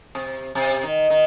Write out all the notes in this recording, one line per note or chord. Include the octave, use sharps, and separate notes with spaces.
C3
C3
D#3
D#3